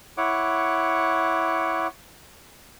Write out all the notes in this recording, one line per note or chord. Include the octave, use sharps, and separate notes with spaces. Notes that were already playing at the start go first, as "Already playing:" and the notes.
E4 C#5 F#5 D6